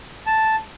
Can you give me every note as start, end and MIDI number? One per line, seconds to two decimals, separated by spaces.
0.26 0.56 81